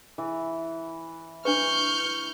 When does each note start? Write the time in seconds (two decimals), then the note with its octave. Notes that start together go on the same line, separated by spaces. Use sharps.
0.18 E3
1.45 D4 B4 C#6 F6 G6